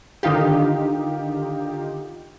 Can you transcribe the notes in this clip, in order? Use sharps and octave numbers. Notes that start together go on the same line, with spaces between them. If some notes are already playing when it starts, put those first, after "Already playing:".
D3 D#3 D#4 F4 G4